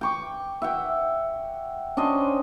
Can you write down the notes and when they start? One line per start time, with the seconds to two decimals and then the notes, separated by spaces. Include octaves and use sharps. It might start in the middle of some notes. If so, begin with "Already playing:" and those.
0.01 G5 C#6 D6
0.62 E5 F#5 G5
1.97 C#4 D4 C5 D#5